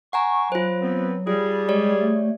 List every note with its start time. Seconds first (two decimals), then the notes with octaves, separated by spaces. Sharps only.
0.13 F#5 G#5 A#5 C#6
0.52 F#3 F4 C5
0.82 B3 C4
1.27 G3 F4 G#4
1.68 G#3 G4 C#5 D5
2.00 A3